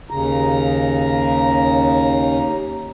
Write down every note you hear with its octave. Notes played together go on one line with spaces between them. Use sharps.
D#2 C#3 A#5